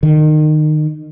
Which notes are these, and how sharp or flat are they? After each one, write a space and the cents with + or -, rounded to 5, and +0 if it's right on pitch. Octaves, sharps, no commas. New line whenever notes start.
D#3 -25